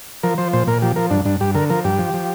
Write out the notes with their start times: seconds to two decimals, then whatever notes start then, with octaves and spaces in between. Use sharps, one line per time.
0.23 F3 A#4
0.38 F3 C5
0.53 A#2 C5
0.67 A#2 A#4
0.82 F3 G4
0.96 F3 A#4
1.10 G2 D4
1.25 G2 D4
1.41 G2 G4
1.55 D3 A#4
1.70 F3 A#4
1.84 G2 G4
1.99 F3
2.14 F3